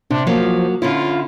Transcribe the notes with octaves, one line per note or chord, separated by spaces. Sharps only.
C3 D4
F3 F#3 A#3
D3 C#4 E4 F4